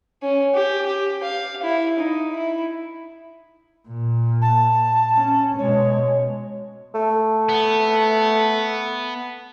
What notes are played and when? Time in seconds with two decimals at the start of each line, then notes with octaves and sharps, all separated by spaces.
0.23 C#4
0.54 G4
0.86 G4
1.23 F5
1.63 E4
1.99 D#4
2.36 E4
3.89 A#2
4.42 A5
5.15 C#4
5.59 B2 G#3 C#5
6.95 A3
7.49 B3